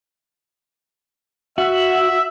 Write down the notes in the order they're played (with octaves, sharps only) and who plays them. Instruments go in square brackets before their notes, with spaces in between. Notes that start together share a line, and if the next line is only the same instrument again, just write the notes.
[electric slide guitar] F#4 [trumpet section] E5